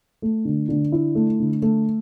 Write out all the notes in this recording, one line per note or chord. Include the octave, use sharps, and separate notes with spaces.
A3
D3
D3
E4
A3
D3
A3